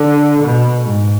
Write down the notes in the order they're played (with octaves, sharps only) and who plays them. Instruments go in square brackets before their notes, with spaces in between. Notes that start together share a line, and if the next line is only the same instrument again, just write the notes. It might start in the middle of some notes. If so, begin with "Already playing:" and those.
Already playing: [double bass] D3
B2
G#2